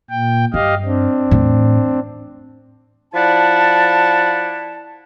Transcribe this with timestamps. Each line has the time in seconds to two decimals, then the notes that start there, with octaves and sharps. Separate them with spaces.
0.10 A#2 G5
0.54 G2 G4 D#5 F5
0.85 C4 D4
1.31 E2 A2
3.14 F3 E4 D5 F#5 A5